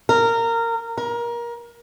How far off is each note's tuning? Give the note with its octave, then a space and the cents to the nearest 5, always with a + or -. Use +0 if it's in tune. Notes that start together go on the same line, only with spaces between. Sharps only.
A#4 -20
A#4 +25